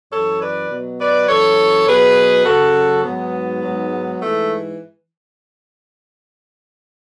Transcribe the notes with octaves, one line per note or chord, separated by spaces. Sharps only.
F#2 E3 A4 C#5
B4 D5
B2 F#3
B4 D5
F#2 E3 A4 C#5
B2 F#3 G#4 B4
F#2 C#3 F#3 F#4 A4
G#2 F#3 B3
G#2 F#3
G#2 E3 A3